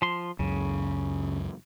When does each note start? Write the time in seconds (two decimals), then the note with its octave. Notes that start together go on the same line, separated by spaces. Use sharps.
0.02 F3 C6
0.39 C#2 F#2 C#3